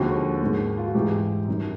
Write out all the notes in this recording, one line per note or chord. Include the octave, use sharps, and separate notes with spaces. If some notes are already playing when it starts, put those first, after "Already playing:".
Already playing: D#2 D3 F3 G#3 F#4
G#2 D#3 G#3
F4
F#4
G#2 E3 G#3 G4
F#2 D#3 G3